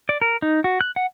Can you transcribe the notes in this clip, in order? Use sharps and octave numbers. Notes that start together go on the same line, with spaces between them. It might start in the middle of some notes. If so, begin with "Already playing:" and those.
D5
A#4
D#4
F#4
F#6
F#5